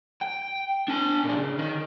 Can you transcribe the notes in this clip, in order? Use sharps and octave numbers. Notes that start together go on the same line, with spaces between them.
G5
D4 G#5
A#2 D4
C#3
D#3